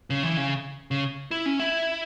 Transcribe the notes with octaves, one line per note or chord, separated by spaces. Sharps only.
C#3
E3
C#3
C#3
E4
C#4
E4